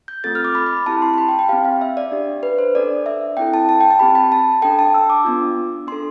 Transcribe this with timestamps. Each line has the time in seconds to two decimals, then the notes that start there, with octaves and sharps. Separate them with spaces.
0.08 G6
0.24 A3 C4 F4 A4 A6
0.35 F6
0.45 D6
0.55 B5
0.67 B5
0.77 B5
0.86 C4 E4 G4 A5
1.02 C6
1.14 A5
1.18 B5
1.29 G5
1.39 G5
1.49 G4 F5
1.52 C4
1.65 F5
1.81 E5
1.97 D5
2.12 D4 G4
2.43 B4
2.58 C5
2.75 D4 A4 D5
3.06 E5
3.37 C4 E4 A4 G5
3.54 A5
3.69 A5
3.81 G5
3.91 A5
3.99 C4 G4 B5
4.15 B5
4.32 A5
4.62 D4 A4 G5
4.79 A5
4.94 E6
5.10 D6
5.25 B3 D4 F4
5.87 D4 C6
5.92 A4